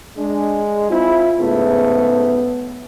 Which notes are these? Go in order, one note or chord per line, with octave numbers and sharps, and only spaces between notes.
G#3 D4
C4 E4 F4
G#2 C#3 A3 B3